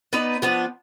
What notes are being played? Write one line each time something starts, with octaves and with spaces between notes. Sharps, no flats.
B3 D#4 B4 D5
F3 B3 D4